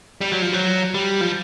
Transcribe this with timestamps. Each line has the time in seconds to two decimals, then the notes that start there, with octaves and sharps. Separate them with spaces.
0.21 G3
0.32 F#3
0.42 F3
0.53 F#3
0.94 G3
1.21 F3